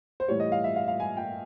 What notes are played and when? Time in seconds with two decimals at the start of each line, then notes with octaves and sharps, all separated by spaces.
0.20 C5
0.28 A2 E3 G3 C#5
0.40 D#5
0.52 F5
0.64 E5
0.76 F5
0.88 F5
1.00 G#5
1.17 G5